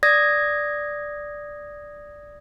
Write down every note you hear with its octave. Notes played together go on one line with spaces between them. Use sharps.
D5 D#6 G#6 A#6